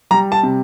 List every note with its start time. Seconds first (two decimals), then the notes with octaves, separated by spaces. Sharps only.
0.11 G3 A#5
0.32 A5
0.43 C3